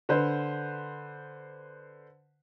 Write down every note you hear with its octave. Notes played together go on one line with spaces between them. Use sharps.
D3 B4 C5